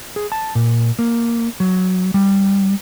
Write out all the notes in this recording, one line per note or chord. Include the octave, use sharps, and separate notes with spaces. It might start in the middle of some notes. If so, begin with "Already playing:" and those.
G#4
A5
A#2
A#3
F#3
G3